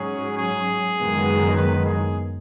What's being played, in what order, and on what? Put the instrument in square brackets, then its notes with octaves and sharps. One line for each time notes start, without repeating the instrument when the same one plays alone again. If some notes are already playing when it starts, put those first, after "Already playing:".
Already playing: [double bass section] G#2 F#3 C#4 [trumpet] G#4
[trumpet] G#4
[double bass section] F#1 F#2 D#3 G#3 B3
[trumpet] B4
G#4